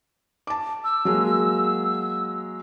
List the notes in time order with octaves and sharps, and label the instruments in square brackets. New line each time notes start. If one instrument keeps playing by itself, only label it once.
[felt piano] A5 D6
[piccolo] E6
[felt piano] F#3 G#3 A#3